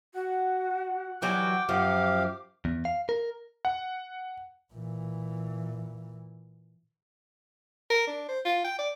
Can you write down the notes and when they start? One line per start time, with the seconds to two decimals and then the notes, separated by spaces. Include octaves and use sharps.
0.14 F#4 F#5
1.22 E3 F#3 G3 G5 D6
1.69 F#2 F3 G4 F5
2.65 E2
2.85 F5
3.09 A#4
3.65 F#5
4.74 A#2 E3
7.90 A#4
8.07 D4
8.29 C5
8.45 F4
8.65 G5
8.79 D5